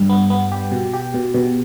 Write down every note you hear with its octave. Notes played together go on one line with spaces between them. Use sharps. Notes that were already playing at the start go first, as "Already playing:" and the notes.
Already playing: G2 G3
B3
B3
G4
B2
G4
B2
B2